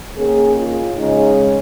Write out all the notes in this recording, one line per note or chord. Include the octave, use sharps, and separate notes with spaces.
D#3 A#3 C#4 G#4
F4
C#3 G#3 C#4 D#4